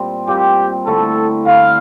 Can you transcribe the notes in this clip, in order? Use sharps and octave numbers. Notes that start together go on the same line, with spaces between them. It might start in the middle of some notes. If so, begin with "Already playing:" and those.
Already playing: A#2 G3 C4
A#2 G3 C4 G4
D3 A3 E4 A4
D3 A3 E4 F5